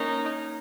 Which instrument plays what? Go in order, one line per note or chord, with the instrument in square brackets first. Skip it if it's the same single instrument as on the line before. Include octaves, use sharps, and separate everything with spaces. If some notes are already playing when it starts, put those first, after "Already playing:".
Already playing: [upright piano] A#3 C#4 [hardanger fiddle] D#4